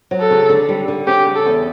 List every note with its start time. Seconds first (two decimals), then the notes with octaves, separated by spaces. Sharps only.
0.11 F#3
0.20 A4
0.30 C#3
0.49 D3
0.69 G3
0.88 D3
1.07 C#4 G4
1.27 C#3
1.36 A4
1.45 E2